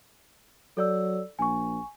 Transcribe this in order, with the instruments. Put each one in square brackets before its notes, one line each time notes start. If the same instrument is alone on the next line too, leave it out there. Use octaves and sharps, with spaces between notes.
[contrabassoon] F#3 [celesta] A4 D5 E6
[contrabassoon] A#1 [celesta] G#5 C#6